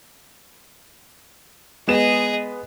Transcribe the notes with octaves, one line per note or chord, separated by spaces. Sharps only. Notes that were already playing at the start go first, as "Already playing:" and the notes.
G#3 B3 G#4 D#5 E7